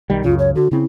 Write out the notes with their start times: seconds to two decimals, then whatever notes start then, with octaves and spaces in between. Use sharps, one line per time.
0.10 B1 D#3 G3
0.24 C#2 F#2 C#3 F4
0.39 C#5
0.55 D3 F#4
0.72 C#3 C4 E4